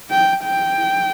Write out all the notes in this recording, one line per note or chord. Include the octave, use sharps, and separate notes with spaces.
G5
G5